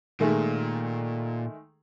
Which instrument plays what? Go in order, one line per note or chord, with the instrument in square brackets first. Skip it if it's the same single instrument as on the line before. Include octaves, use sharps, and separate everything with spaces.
[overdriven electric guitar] A#2 [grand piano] D#3 G#3 A3